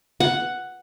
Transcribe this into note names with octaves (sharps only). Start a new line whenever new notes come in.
F#5